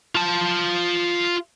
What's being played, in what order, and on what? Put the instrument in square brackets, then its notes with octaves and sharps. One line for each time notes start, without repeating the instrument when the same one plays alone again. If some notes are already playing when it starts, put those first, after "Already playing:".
[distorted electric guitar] F4 A5